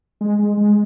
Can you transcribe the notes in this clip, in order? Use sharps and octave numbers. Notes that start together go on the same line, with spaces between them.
G#3
G#3
G#3